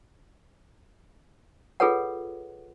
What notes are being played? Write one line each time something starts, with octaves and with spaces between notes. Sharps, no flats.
F4 G#4 A4 B4 C#5 F#5